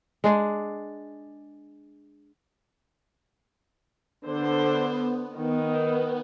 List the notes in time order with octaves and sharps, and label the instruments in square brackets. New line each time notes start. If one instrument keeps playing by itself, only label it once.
[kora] G#3 D4 G#4
[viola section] D3 C5 [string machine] B3
[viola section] D#3 [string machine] B3